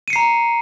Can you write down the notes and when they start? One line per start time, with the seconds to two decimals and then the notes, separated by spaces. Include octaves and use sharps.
0.08 D#7
0.10 C#7
0.13 C7
0.16 A#5